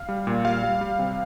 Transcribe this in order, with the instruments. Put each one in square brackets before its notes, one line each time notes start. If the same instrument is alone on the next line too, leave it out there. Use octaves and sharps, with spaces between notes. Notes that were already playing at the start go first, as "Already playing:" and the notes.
Already playing: [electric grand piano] F5
G3
A#2
G3 F5
G3
G3
C3